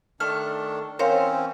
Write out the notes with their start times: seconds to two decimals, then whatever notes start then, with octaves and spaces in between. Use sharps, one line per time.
0.20 D#3 A3 D4 A4 F6
0.99 E3 C4 C#4 A#4 C5 C#5 F5